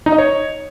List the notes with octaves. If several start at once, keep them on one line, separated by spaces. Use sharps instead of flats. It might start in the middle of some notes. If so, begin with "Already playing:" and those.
D#4
D#5
C#5